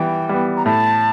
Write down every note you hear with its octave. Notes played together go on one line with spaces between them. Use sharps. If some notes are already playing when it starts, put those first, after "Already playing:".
Already playing: E3 G3 B3 G5
G3 B3
A#5
A2 A5